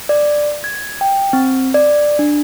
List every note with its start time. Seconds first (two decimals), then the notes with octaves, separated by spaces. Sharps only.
0.09 D5
0.64 G#6
1.01 G5
1.33 C4
1.74 D5
2.19 D4